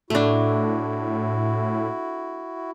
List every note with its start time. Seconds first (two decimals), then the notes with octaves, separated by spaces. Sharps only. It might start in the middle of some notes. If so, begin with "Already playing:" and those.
0.10 A2 A3 D4 E4 F#4